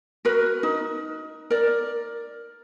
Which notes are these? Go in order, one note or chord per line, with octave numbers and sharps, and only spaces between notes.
F#4 A#4 B4
D#4
A#4 D5